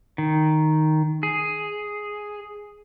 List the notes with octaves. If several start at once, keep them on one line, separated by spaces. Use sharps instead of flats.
D#3
G#4